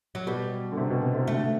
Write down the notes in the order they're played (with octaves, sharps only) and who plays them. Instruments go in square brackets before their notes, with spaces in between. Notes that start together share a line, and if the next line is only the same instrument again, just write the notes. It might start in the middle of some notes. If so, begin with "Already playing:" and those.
[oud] F#3
[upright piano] B2 [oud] G3
[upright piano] D3
C3
B2
C3
C3
[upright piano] D3 [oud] A3